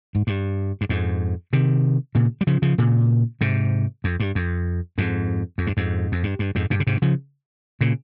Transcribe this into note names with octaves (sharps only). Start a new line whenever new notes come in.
G#2
G2
G2
F2 G#2
C3 D#3
A#2 C#3
G3
C#3 F3
C#3 F3
A#2 C#3
G#2 C3
F2
G2
F2
F2 G#2
F2
G2
F2 G#2
F2
G2
G2
F2 G#2
G2 A#2
C#3
G#2 C3
C#3 F3
A#2 C#3